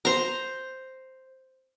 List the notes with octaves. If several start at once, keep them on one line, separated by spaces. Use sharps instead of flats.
C5 A#5